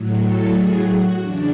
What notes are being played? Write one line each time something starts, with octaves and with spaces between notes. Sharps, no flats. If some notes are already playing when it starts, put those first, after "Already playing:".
Already playing: A2 F#3
A4
G#4
F#4
E2 C#3 D4